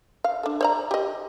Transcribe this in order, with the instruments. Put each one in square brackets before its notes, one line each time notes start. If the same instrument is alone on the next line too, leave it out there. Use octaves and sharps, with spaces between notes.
[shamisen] F5
D4 A4
C5 D5 A#5
G4 D#5